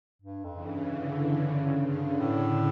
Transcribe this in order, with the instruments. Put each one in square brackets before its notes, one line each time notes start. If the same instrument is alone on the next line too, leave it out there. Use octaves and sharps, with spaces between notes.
[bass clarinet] G2
F2
[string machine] C#3 E3
[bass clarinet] G2
[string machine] D3
[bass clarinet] G2 [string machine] C#3
[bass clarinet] G2 [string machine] D3
[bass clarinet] A2 [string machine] D3